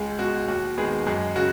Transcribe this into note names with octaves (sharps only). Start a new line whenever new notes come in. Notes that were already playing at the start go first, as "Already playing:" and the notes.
Already playing: C#2 G#3 G#4
B2 G#3 F#4
D#2 F#4
D#3 G#3 B3 G#4
F#2 G#3 G#4
C#3 F#4